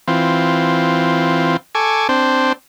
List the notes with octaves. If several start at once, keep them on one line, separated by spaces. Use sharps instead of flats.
E3 C4 F4
A4 G#5 C#6 D6
C4 D4 C5